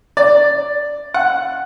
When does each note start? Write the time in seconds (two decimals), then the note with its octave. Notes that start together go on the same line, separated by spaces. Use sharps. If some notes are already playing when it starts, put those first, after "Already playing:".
0.17 D5
1.14 F#5